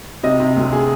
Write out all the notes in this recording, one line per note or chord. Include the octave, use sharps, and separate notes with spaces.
C3 D#5
C3
D2
G#4